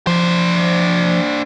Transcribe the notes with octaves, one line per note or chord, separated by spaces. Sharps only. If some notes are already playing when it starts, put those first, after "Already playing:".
F3 D4 C5